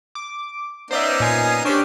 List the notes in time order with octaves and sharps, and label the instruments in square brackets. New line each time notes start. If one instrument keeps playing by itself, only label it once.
[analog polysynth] D6
[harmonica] B3 C#4 D#4 [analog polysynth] C5 D5 E5
[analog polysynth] A#2 G#5 C7
[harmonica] C#4 C5 C#5 [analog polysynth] D4 G4